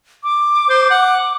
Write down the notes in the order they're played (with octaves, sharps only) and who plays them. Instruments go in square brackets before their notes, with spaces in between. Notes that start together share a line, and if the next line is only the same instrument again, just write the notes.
[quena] D6
[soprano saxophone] C5
F#5